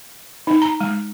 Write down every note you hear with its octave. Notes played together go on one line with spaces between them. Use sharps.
D#4
A#5
G#3